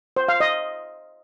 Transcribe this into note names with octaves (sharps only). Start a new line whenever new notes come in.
C5
F5
D#5